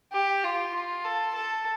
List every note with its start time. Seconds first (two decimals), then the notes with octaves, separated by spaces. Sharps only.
0.13 G4
0.44 F4
0.74 F4
1.05 A4
1.35 A4